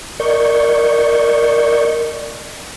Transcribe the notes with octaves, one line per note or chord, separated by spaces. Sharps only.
A#4 D5 D#5 C#6 G6